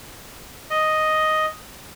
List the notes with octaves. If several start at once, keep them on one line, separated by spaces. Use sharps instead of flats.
D#5